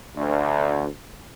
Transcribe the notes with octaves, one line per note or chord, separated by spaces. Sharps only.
D2